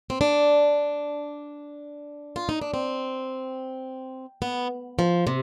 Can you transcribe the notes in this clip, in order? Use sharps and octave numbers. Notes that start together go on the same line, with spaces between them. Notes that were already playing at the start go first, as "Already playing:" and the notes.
C4
D4
F4
D#4
D4
C4
B3
F3
C3